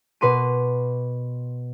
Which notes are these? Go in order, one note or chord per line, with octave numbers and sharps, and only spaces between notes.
B2 B4 C6 D6 D#7